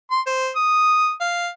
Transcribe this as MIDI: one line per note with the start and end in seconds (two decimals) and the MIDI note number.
0.11 0.21 84
0.26 0.50 72
0.56 1.12 87
1.21 1.48 77